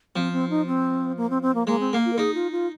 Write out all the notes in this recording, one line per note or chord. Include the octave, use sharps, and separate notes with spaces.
F3 C4
C4
D#4
C4
A#3
C4
C4
A#3
G#3 A#3
C4
A#3
F4
A#4
D#4 G#4
F4
F4